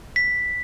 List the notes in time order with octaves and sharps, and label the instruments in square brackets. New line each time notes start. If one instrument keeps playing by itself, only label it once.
[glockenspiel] B6